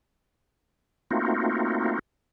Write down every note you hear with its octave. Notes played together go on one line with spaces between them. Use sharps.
A3 A#3 C4 D#4 F4 F#4